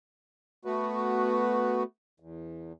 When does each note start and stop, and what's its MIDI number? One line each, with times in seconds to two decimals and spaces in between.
0.65 1.83 57
0.65 1.83 59
0.65 1.83 66
0.65 1.83 71
2.20 2.72 40